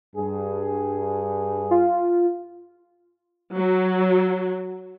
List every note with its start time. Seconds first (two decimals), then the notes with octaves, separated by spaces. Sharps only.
0.16 G2 G#4
1.71 F4
3.55 F#3